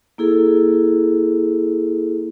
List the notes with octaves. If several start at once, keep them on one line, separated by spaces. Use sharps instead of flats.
A#3 E4 G#4 A4